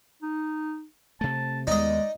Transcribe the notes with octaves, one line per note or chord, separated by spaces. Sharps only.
D#4
C3 A3 A5
D#2 G#3 A#3 B3 D#4 D5 D#5